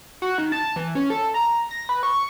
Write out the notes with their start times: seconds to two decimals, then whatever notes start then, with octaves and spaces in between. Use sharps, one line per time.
0.22 F#4
0.38 D#3
0.52 A5
0.76 E3
0.95 C#4
1.10 A4
1.34 A#5
1.71 A#6
1.89 B4
2.03 C#6